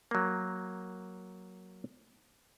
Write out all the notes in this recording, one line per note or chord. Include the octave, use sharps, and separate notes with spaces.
F#3 A#3